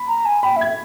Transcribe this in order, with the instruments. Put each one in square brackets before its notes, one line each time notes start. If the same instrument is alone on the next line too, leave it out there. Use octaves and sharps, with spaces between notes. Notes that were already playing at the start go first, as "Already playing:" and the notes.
Already playing: [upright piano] B5
[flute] A#5
G#5
[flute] G5 [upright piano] B5
[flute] E5 [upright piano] G#6